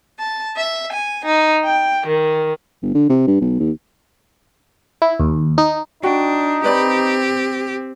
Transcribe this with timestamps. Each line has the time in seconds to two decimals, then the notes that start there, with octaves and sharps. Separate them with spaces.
0.19 A5
0.57 E5
0.92 G#5
1.25 D#4
1.64 G5
2.06 D#3
2.82 G1
2.95 D3
3.09 C3
3.27 G2
3.41 B1
3.60 D#2
5.02 E4
5.20 D#2
5.58 D#4
6.03 D4 D#4 F#4 G5
6.64 C4 G4 B4 D5 B5